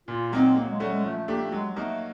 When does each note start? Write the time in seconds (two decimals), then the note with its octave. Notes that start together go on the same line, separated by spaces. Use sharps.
0.08 A#2 F4
0.32 F#3 A#3 C4 D#4
0.55 F#3 A#3
0.68 G#3
0.80 G3 A3 C#4 F#4
0.91 G#3
1.04 F3 A3
1.16 A3
1.28 A3 A#3 D4 G4
1.40 A3
1.52 F#3 G#3
1.70 G#3
1.76 A3 A#3 D#4 F#4